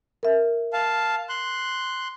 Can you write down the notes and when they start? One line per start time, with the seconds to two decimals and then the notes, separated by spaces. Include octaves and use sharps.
0.23 A#4 E5
0.73 F5 A5
1.29 C6 F#6